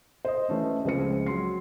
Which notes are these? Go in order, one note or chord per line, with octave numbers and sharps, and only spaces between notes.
C5 D#5
E3 A3 C#4
C#2 F3 C4 C#7
F#3 C6 C7